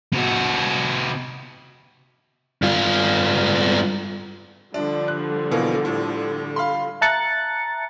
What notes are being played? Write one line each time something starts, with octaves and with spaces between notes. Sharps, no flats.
C3 F#4
G2 F4
D3 F3 G3 D4
F#6
B2 E3 A#3
A2
F5 B5 C6
E5 A5 A#5 F#6 A6 C#7